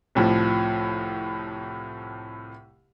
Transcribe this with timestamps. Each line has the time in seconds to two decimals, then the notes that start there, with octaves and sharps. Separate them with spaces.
0.15 C2 A2 F3